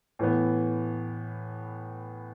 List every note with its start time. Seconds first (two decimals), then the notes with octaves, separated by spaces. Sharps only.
0.19 A2 E3 B3